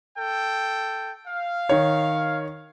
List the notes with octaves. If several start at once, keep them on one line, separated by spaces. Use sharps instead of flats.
A4 G5
F5
D#3 C#5